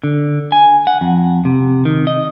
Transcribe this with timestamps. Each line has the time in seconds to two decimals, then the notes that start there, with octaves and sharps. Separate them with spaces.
0.04 D3
0.52 G#5
0.87 F#5
1.01 F2
1.45 C3
1.85 D#3
2.07 D#5